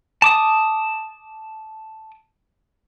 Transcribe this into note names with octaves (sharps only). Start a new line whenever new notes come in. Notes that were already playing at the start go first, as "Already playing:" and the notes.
A5 D6 D#6